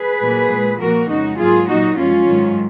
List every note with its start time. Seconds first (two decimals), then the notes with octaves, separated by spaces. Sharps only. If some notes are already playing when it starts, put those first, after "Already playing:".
Already playing: G#4 B4
0.21 A#2 F#3 A#3
0.50 A#2 G#3
0.80 A#2 F3 A#3 F#4 A#4
1.10 F2 C#3 G#3 D#4 F#4
1.39 G#2 F#3 A#3 F4 G#4
1.68 A#2 F#3 A#3 D#4 F#4
1.98 F#2 F3 G#3 C#4 F4
2.28 G#2 D#3 F#3